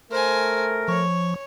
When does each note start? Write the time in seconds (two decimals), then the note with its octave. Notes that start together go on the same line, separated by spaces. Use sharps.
0.11 A3 A#4 C5 G#5
0.88 F3 C#5 C#6